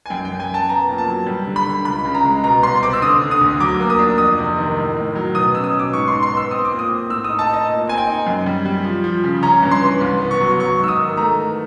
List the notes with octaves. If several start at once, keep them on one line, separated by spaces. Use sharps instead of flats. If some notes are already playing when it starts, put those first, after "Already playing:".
G#5
F#2 G5
F#2 G5
G#5
F#2 A5
B3 A#5
A#2
A5
F#3
G3
D3
B5
D3
C#2 B5
C#3
A#5
G#3
B2 A#5
C2 C6
C4 D6
E6
D3 D#6
D3
D#6
D2
F#3 D6
A#3
D#6
D4
F2 D#6
C3
D#3
A2
A2
F#3
B2 D#6
C#4 E6
D#6
B2
D6
G#2 C#6
G#2 C6
C6
B3
E6
C4 D#6
D6
A#2
D#6
C4
A2 E6
D#4 D#6
A5
D#4 D#5
A#2
C4 G#5
G5
D#4
F#2
G3
G3
F3
F3
C#3
C#4 A#5
G2
C6
E3
C2
B3
C#6
F#3
F#3 C#6
G#2 E6
D#6
D#3
A3 A#5
E3